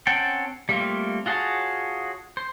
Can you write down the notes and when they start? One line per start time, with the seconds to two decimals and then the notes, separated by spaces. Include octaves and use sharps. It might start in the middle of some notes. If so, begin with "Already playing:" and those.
0.07 C4 C#4 F#5 G5 A5
0.69 G3 A3 A#3 C4 F4
1.26 F4 F#4 G#4 C#5 A5
2.37 C5